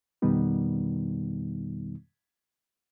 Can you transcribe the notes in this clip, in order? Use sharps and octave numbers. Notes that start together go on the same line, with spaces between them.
F2 B2 D#3 G3 B3 D#4